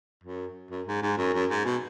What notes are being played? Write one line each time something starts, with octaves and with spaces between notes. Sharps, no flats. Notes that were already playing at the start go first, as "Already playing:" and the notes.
F#2
F#2
G#2
G#2
F#2
F#2
G#2
B2